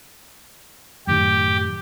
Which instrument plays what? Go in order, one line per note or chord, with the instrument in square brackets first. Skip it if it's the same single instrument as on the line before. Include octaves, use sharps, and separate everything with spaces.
[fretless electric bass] F#2 A2 D#3 [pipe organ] G4